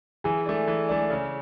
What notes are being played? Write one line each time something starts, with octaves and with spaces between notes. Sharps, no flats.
E3 G#4
A3 D4
E3
A3 D4
C#3